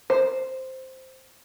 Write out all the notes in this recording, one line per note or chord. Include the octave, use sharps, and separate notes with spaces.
C5